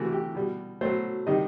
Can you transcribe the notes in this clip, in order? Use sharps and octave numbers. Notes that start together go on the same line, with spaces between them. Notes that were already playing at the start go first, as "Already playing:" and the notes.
Already playing: C3 E3 A3 F#4
G4
B2 G3
B2 F#3 A3 C5
C3 D#3 G3 D#5